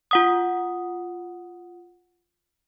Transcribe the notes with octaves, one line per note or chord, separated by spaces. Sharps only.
F4 F#5 D#6